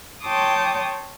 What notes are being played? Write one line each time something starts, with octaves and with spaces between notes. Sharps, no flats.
C#5 G5 A5 C6 D6 D#6